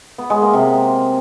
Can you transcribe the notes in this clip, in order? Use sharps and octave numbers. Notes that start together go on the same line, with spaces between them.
B3
G#3
A#3
C3